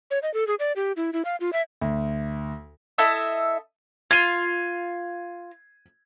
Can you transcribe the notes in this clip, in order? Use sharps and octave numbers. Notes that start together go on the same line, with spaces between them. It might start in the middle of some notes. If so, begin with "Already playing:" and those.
C#5
D#5
A4
G#4
D5
G4
E4
E4
F5
F4
E5
D2
E4 A4 D#5 E5
F4 G#6 C7 D#7